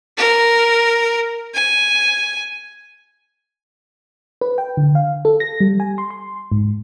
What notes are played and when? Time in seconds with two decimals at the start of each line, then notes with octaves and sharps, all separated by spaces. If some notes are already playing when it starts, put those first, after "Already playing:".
0.18 A#4
1.54 G#5
4.41 B4
4.58 G5
4.77 D3
4.95 F5
5.25 A4
5.40 A#6
5.60 G3
5.80 G#5
5.98 C6
6.10 C6
6.52 G#2